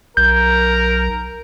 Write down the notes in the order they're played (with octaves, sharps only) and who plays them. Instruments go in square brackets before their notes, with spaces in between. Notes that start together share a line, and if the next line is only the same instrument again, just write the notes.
[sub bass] B1 [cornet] A#4 [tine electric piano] G6